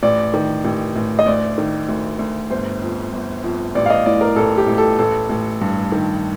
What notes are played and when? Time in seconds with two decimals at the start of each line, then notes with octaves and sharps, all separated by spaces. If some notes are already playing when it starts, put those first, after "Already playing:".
0.03 A1 D5
0.34 D#3
0.64 A1
0.95 A1
1.19 D#5
1.26 D2 D5
1.58 D#3
1.89 D2
2.19 D2
2.50 G1 C5
2.82 F2
3.13 G1
3.44 F2
3.75 A1 D5
3.86 F5
3.90 D#5
4.06 A2 D5
4.21 A#4
4.36 A1 A4
4.57 G4
4.67 A1
4.78 A4
4.99 A1 A4
5.29 A1
5.61 G2
5.92 D#3